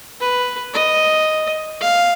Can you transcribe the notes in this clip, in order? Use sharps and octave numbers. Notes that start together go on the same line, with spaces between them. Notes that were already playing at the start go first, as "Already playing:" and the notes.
B4
D#5
F5